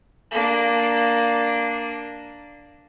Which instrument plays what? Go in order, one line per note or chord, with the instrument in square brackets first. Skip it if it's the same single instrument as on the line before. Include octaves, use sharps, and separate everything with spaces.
[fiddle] A#3 D4